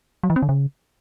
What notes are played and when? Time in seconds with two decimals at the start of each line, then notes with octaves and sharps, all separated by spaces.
0.23 F#3
0.30 E3
0.36 C4
0.42 D3
0.49 C#3